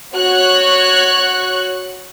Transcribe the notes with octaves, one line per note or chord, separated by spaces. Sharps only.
F#4 C#5 F#6